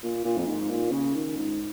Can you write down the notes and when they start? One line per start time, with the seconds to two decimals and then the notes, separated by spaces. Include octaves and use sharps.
0.03 A#2
0.25 A#2
0.37 F2
0.47 G#2
0.70 A#2
0.92 C#3
1.15 D#3
1.36 G#2